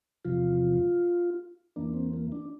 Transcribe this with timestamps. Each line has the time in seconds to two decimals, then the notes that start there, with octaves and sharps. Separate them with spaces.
0.25 E2 C3 F3 F4
1.76 E2 E3 A#3 D4
1.94 C4
2.13 A#3
2.32 D4